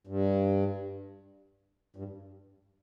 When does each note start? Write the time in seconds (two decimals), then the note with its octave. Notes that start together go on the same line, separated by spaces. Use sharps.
0.07 G2
1.96 G2